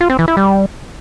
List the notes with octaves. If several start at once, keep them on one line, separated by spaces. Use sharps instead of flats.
F4
C4
E3
E4
G3